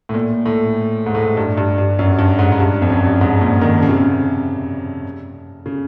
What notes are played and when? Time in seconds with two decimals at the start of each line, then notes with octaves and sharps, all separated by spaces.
0.09 A2
0.14 A#2
0.46 A2
1.06 G#2
1.15 A2
1.22 G#2
1.37 G2
1.57 G2
1.78 G2
1.99 F#2
2.19 G2
2.39 G#2
2.52 G#2
2.60 G2
2.82 F2
2.90 F#2
3.06 G2
3.21 G#2
3.41 A#2
3.61 D#3
3.83 C#3
3.89 C3
3.96 C#3
5.66 C#3